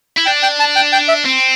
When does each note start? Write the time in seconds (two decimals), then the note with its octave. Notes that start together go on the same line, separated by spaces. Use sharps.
0.17 E4
0.26 D4 G5
0.43 G5
0.60 A5
0.76 G5
0.93 G5
1.08 E5
1.25 C4